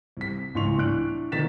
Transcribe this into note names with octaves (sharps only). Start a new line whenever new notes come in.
C2 B6
C#2 A2 E3 C6 C#6 F7
A2 D4 F#6 D7
B2 D3 D#3 A6 B6 E7